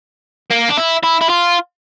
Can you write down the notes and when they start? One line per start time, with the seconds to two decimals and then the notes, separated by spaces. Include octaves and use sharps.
0.50 A#3
0.69 D4
0.77 E4
1.04 E4
1.21 E4
1.30 F4